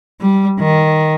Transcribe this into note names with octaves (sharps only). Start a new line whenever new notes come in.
G3
D#3